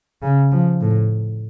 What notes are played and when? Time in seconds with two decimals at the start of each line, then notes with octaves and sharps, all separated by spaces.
0.22 C#3
0.51 F3
0.81 A2